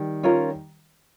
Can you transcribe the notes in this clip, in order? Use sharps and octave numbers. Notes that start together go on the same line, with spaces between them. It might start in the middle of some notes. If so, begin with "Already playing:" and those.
Already playing: D#3 G3
C#4 F4 A#4